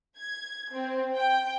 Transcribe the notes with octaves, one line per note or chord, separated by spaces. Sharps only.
G#6
C4
G5